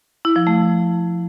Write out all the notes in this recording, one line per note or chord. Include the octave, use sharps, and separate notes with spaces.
E4
F3
A3